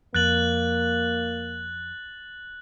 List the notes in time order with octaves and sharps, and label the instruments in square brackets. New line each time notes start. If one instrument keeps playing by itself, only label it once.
[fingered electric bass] F2 [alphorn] A#3 [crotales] F#6 A6 F#7